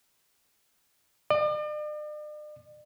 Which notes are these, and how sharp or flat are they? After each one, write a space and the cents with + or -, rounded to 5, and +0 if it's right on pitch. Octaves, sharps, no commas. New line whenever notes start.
D5 +45